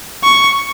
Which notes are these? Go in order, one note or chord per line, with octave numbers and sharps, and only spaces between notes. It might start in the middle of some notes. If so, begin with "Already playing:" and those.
C#6